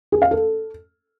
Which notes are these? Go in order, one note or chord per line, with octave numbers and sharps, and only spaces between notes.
G#4
F5
A4